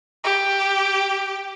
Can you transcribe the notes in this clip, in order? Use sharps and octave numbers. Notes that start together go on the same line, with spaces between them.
G4